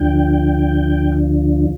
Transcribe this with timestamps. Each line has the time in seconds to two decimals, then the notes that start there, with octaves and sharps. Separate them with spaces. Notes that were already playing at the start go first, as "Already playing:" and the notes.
Already playing: D2 D3 F3 G5